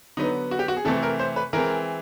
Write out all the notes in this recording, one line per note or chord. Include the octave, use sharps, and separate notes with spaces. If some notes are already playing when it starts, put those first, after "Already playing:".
D3 F#3 B3 D#4
F#4
G4
F#4
G#4
C3 E3 A3 C4 A4
A#4
C5
B4
E3 G#3 C4 A#4